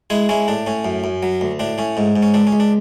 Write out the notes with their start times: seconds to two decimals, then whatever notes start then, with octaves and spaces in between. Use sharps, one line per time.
0.10 G#3 E4 G#4
0.29 G#3 C#4 E4
0.48 A2 D4
0.67 A2 C#4
0.85 F#2
1.04 F#2
1.23 F#3
1.41 D2
1.59 A2 D4
1.78 A2 C#4
1.97 G#2
2.16 G#2
2.23 C#4
2.34 C#2 D4
2.47 C#4
2.52 C#2
2.60 D4